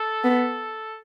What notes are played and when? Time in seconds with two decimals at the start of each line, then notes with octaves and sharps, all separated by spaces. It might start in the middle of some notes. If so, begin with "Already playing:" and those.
Already playing: A4
0.24 B3